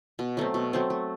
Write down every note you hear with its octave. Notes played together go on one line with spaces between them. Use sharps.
B2
F#3 A3 C4
B2
F#3 A3 C4
A3